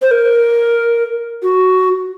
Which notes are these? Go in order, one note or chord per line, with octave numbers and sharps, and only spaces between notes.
C5
A#4
F#4